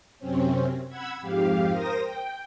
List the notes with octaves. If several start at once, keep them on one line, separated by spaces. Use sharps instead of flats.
F#2 C3 C4 C#4
F#5 B5 E6 G#6
F2 G#2 G4 F5
A#4 C5 D#6 A#6
G5